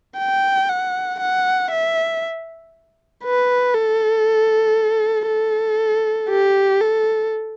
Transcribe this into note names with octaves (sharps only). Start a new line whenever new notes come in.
G5
F#5
F#5
E5
B4
A4
A4
G4
A4